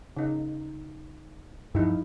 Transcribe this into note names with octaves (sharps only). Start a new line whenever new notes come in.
C#3 D#4
G2 F3 D#4 E4